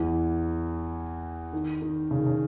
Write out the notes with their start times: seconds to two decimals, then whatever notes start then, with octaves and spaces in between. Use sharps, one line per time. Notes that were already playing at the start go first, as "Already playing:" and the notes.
Already playing: E2 E3
1.53 D#3
1.82 D#3
2.11 C#3
2.18 D#3
2.26 C#3